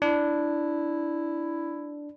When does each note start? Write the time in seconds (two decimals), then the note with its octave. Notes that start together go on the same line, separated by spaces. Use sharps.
0.02 D4 E4